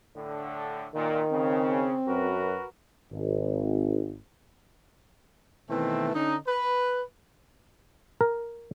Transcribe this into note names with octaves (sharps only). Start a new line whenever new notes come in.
A2 D3
A#2 D#3
C#3 C4
F#2 F#4 A#4 B4
G#1
B2 D#3 E3 A3 C4
D3 C#4 D#4
B4
A#4